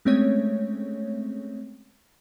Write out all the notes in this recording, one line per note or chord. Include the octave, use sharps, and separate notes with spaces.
G#3 A3 C4 C#4 C#5